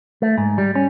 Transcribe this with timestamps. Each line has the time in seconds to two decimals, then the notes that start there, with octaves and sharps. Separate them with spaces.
0.22 A3
0.38 G#2
0.58 G3
0.75 C#4